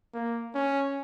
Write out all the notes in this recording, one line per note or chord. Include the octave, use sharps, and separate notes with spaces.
A#3
C#4